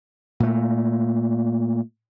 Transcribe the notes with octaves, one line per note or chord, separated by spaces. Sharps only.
A#2 A3